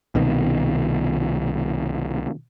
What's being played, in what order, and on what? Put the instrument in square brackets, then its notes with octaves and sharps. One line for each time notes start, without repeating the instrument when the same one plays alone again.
[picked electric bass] C2 B2 D#3